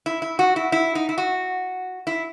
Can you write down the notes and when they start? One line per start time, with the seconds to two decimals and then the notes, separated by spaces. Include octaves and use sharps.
0.06 E4
0.22 E4
0.39 F#4
0.56 E4
0.72 E4
0.95 D#4
1.09 E4
1.18 F#4
2.07 E4